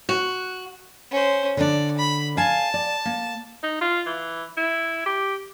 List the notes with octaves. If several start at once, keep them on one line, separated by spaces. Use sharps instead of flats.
F#4
C#4 C5
D3 D4 D5
B5
F5 G#5 A5
D5
A#3
D#4
F4
E3
E4
G4